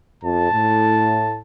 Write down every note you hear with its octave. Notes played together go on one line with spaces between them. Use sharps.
F2 A5
A2